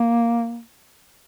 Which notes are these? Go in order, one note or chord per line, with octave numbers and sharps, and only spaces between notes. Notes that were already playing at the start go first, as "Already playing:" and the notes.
Already playing: A#3